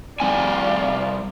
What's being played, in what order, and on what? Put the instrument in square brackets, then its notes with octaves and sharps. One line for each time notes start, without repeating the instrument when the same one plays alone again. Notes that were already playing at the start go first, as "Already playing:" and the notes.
[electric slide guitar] G3 C4 G#5 [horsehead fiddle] D5 F5